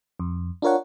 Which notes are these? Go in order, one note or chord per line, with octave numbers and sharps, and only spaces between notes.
F2
D4 F4 A#4 C#5 F#5